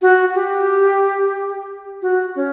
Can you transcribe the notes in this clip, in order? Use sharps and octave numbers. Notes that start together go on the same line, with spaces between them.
F#4
G4
F#4
C#4